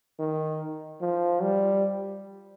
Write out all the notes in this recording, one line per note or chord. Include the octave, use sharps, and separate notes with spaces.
D#3
F3
G3